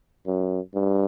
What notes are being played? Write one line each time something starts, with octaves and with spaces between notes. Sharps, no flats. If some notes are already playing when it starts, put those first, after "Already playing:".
F#2
G2